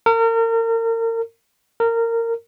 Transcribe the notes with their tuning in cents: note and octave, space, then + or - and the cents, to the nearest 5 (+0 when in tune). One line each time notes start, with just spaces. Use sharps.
A#4 -35
A#4 -20